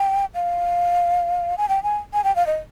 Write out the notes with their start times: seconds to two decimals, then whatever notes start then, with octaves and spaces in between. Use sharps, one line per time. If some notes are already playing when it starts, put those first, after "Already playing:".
Already playing: G5
0.35 F5
1.58 G#5
1.69 G5
1.83 G#5
2.13 G#5
2.24 G5
2.36 F5
2.47 D#5